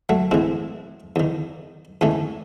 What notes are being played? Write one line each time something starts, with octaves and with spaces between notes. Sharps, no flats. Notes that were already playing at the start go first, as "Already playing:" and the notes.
F#3 A3
A2 E3 G#3 C4
E2 D#3
E2 D#3 A3 C#4